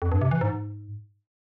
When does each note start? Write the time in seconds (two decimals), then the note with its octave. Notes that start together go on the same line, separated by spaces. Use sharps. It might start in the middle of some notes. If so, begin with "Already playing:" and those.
0.02 F2
0.12 G2
0.21 C3
0.31 E3
0.41 G#2